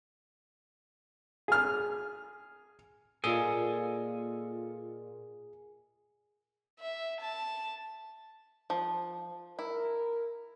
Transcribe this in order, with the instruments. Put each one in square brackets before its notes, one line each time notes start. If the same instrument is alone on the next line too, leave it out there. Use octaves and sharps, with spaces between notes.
[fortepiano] G#4 F6
[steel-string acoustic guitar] A#2 D#5 [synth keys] A#3 F4 [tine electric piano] G#4 [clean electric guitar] A4 G#5
[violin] E5
A5
[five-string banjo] F3
[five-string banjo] E4 [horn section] A#4